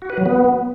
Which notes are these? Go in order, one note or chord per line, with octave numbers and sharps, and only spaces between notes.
F#4
B4
F#3
B3